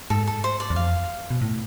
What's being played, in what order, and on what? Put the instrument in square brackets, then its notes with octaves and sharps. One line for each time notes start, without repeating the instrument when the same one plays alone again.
[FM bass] G#2 [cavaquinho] A4
[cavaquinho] A4
C5
D5
[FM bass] E2
[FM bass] F2 [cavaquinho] F5
[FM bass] B2
A2